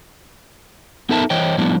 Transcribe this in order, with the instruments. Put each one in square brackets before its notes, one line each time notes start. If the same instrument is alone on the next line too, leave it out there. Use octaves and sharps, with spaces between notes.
[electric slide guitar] B3 D#4 A4 A#4 E5 A5
E3 C5 C#5 D#5 G5
A2 F3 G3 B3 D4 E4